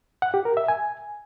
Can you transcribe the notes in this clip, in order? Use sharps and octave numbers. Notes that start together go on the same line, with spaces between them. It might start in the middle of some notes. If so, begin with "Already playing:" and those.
F#5
G4
A#4
E5
G#5